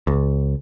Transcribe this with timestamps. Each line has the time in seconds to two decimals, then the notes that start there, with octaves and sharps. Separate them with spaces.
0.07 C#2